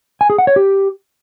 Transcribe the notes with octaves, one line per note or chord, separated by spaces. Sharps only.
G#5
G#4
F#5
C#5
G4